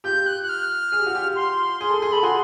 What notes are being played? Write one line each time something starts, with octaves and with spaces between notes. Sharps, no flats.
F4 G4 G6
F#6
F#6
F6
G#4
G4
F#4
F4 G4
C6
G#4
A4
G#4
A4 B5
F#4 G#4 C6